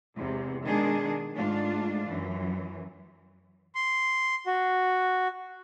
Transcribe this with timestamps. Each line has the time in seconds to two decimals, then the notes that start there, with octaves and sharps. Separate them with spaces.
0.18 E2 G#2 C3
0.65 B2 D#3 G#3 D4 G#4
1.35 G#2 A3 D4 F4
2.06 F#2 E3
3.75 C6
4.47 F#4